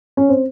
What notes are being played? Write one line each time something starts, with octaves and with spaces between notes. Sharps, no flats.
C#4
C4